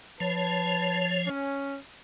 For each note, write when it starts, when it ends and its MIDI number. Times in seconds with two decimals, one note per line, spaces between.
0.20 1.30 53
0.20 1.07 71
0.20 1.30 73
0.20 1.07 81
1.26 1.76 61